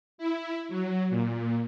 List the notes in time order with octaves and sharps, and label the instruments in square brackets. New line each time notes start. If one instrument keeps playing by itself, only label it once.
[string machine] E4
F#3
A#2